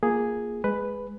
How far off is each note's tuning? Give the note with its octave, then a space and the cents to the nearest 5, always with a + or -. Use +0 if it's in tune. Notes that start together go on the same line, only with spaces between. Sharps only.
A#3 +0 F4 +0 G#4 +0
G#3 +0 B4 +5